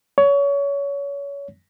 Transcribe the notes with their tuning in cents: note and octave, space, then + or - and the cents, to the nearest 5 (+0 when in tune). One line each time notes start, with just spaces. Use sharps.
C#5 +25